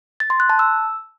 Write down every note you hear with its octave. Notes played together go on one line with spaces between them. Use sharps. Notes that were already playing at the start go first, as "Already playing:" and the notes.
A6
C6
F#6
A5
E6